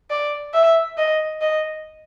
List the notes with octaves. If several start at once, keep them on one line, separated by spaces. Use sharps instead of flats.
D5
E5
D#5
D#5